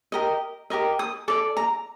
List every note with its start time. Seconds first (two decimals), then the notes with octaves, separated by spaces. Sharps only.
0.12 G4 A#4 D#5
0.70 G4 A#4 D#5
0.99 D#6
1.28 A4 D5 D6
1.57 A#5